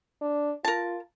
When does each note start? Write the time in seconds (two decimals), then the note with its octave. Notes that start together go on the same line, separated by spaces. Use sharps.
0.22 D4
0.65 F4 A#4 A5